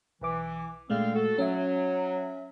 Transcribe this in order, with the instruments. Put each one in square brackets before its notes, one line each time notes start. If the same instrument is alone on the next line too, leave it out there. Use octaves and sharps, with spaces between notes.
[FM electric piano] B1 D6 [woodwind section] E3
[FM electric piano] A#2 G#3 A3 [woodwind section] D3 C4 F5
[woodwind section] F#4 A4
[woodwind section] F#3 [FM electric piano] C#4 E5